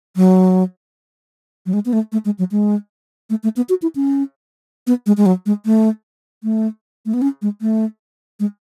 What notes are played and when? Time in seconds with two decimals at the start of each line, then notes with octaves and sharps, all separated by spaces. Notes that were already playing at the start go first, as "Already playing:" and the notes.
0.16 F#3
1.66 F#3
1.73 G#3
1.85 B3
1.93 A3
2.12 A3
2.25 G#3
2.38 F#3
2.51 G#3
3.30 A3
3.43 A3
3.56 B3
3.69 F#4
3.82 E4
3.95 C#4
4.87 B3
5.06 G#3
5.17 G#3
5.26 F#3
5.46 G#3
5.65 A3
6.43 A3
7.06 A3
7.14 B3
7.22 C#4
7.42 G#3
7.61 A3
8.40 G#3